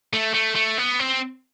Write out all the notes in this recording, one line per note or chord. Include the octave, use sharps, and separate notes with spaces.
A3
A3
A3
B3
C4